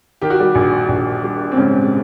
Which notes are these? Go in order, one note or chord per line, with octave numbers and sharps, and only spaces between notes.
D#3 G4
F#4
G3 G4
A#1
A#1
G3
C4
G#2 C#3 C#4